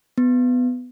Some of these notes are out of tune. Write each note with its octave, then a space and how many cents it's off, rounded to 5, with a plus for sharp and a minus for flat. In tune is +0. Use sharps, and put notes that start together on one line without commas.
B3 +15